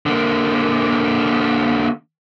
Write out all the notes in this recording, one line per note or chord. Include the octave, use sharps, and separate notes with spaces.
D3 A#3